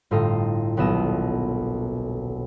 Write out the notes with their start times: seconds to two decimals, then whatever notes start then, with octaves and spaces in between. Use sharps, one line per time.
0.11 G1 A2 F4 A4 D#5 F5
0.77 D#1 B1 B3 A4 D#5 E7